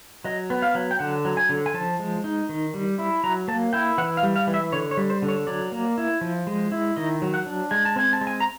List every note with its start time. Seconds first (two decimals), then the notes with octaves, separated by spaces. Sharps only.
0.24 F#3 D#5
0.50 B3
0.62 F5
0.75 F#3
0.91 G5
0.99 D3 F#5
1.25 F#3
1.37 G#5
1.49 D3
1.66 G#5
1.74 F3 A5
1.99 G#3
2.24 D#4
2.49 D#3
2.74 G3
2.98 E4
3.24 F#3 A#5
3.48 A#3 A5
3.73 E4 G5
3.98 E3 F#5
4.17 F5
4.23 G3
4.36 F5
4.47 E3
4.54 E5
4.72 D3 C#5
4.91 C#5
4.97 G3
5.10 C5
5.22 D3
5.28 C#5
5.47 F#3 D5
5.72 A#3
5.98 E4
6.21 F3
6.47 G#3
6.72 E4
6.96 D#3 D#5
7.22 F#3
7.34 F#5
7.46 D4
7.71 G#3 G#5
7.85 A5
7.96 C4 G#5
8.13 A5
8.21 G#3
8.27 G#5
8.40 A#5